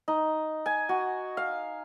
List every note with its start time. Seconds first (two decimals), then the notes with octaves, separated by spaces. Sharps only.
0.08 D#4
0.66 G#5
0.89 F#4
1.37 F5